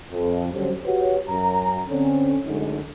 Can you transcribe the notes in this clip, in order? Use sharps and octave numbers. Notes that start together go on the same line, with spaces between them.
F2
D3 F#3 G3 C#4 G4 C5
F#4 G4 B4 C#5
F#2 A#5
D3 C4 C#4
F#2 D3 G#3 A3 D#4